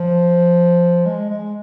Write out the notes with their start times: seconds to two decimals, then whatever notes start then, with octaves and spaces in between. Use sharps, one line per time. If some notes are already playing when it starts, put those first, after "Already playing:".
Already playing: F3
1.06 G#3
1.30 G#3